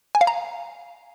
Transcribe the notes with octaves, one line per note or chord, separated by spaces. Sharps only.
G#5
F5
A#5